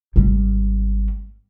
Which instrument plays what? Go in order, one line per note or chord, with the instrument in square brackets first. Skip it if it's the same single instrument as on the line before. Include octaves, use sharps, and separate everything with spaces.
[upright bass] G#1 G3